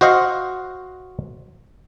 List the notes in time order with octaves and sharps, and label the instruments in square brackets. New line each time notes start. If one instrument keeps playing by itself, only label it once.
[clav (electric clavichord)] F#4 C5 D#5 F5 F#5